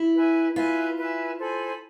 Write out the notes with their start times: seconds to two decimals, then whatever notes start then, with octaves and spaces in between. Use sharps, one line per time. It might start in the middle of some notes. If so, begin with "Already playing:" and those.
Already playing: E4
0.14 B4 E5 G#5
0.56 F4 B4 E5 G#5
0.98 B4 E5 G#5
1.39 A4 C5 G#5 B5